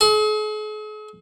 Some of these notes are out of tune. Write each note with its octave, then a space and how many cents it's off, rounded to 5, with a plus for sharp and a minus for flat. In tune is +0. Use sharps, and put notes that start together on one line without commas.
G#4 +45